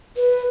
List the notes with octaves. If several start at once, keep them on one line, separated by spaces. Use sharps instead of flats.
B4